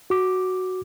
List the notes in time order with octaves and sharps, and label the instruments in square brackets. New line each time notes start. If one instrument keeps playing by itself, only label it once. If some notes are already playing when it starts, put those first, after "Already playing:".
[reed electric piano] F#4 D6